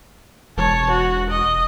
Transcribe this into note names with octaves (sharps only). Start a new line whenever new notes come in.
E1 C#5 A5
F#4
D#5